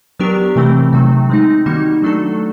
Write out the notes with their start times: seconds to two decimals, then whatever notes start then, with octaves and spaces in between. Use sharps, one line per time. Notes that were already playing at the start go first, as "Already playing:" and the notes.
0.19 F#3 B3 D4 G4 A#4
0.56 C3 E3 A3 C4
0.93 C3 D#3 F#3 A3
1.30 G#3 C4 D#4
1.66 D#3 G3 A#3 D#4 F#4
2.02 F#3 A3 D4 F#4 A4